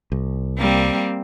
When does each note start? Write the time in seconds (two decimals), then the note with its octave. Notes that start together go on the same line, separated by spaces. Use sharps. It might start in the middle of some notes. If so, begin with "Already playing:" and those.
0.12 C2
0.58 G3 A#3 C4